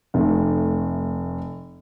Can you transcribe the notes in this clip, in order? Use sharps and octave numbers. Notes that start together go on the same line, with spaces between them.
F1 A3